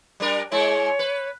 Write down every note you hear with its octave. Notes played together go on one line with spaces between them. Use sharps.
G3 D4 A#4
G#3 A#3 E4 C#5
B4